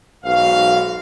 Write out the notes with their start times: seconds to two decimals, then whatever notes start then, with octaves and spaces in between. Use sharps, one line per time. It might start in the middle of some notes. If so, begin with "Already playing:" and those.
0.24 B1 G#2 F#4 F5